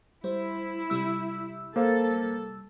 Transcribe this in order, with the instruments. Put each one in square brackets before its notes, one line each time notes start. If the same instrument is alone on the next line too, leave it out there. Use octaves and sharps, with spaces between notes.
[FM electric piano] G3 C5 [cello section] E4
[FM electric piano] C3 G3 E6
[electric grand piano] A#3 C5 F5 [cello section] A4